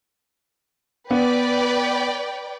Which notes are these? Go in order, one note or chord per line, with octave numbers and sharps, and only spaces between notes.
B3 B4 D5 G5